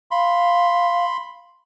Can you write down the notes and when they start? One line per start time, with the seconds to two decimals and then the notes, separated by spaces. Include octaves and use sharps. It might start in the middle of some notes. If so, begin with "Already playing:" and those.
0.11 F5 B5 C6